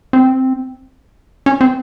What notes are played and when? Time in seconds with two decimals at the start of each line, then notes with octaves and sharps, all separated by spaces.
0.13 C4
1.46 C#4
1.61 C4